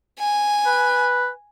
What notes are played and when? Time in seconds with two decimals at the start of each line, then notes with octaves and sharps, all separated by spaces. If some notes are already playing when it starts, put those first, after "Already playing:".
0.20 G#5
0.66 B4